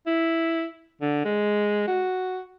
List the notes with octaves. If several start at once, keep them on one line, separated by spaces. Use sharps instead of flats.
E4
D3
G#3
F#4